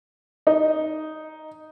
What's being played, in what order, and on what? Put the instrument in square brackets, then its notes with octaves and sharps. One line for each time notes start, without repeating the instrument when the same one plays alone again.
[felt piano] D#4